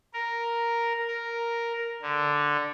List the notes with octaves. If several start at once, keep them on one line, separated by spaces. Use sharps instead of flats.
A#4
A#4
D3